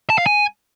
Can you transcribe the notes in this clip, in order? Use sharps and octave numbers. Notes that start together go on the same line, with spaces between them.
A5
F5
G#5